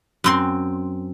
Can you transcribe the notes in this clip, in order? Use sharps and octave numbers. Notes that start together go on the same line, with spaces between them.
F#2 C4 C6